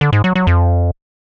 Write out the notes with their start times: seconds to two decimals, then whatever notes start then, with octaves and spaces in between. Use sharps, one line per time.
0.01 D3
0.13 G#2
0.24 F#3
0.36 F#3
0.47 F2